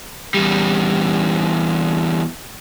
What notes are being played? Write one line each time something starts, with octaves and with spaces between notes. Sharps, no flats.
E2 G3